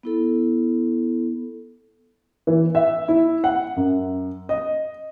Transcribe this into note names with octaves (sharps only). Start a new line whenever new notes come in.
B3 E4 A4
E3
E5
E4
F#5
F#2
D#5